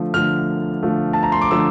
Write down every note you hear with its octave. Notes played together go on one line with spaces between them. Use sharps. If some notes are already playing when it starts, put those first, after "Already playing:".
Already playing: D3 F3 A3
D3 F3 A3 F6
D3 F3 A3
A5
A#5
C6
D6
D3 F3 A3 E6